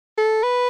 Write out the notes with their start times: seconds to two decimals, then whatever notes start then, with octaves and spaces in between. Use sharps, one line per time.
0.18 A4
0.43 B4